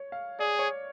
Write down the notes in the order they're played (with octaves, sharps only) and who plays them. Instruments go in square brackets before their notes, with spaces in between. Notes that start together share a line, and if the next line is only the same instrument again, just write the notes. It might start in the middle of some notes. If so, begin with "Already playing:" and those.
Already playing: [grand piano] C#5
F5
[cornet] G#4 [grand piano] D5
[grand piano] C#5